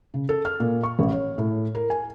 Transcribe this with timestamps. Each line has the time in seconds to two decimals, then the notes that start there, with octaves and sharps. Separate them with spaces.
0.14 C#3
0.29 A4
0.45 F6
0.60 A#2
0.83 C#6
0.99 A1
1.12 C#5
1.38 A2
1.75 A#4
1.90 G#5